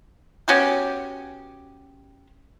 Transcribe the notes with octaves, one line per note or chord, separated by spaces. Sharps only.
B3 C#4 F#4 G4